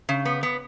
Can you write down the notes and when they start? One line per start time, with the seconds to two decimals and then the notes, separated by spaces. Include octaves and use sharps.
0.09 C#3
0.25 B3
0.43 B3